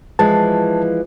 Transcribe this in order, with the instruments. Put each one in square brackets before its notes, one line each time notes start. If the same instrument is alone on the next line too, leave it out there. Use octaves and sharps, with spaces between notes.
[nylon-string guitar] E3 F3 G#3 [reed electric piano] A5